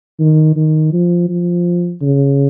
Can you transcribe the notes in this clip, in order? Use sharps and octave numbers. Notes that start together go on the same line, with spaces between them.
D#3
D#3
F3
F3
C#3